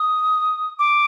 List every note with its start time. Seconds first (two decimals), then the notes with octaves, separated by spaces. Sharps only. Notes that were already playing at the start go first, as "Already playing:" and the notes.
Already playing: D#6
0.79 D6